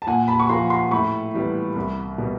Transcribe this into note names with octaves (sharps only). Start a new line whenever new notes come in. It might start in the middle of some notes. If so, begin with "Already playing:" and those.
A5
A#2 F#5 G#5
A5 B5
C#6
F3 A#3 A#5 C6
A#5 C6
A2 B5 C#6
E3 G3 B3
C2
B2 G3